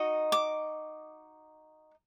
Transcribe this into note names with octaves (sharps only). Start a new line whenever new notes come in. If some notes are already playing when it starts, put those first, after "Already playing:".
Already playing: D#4 F#4 D#5
D6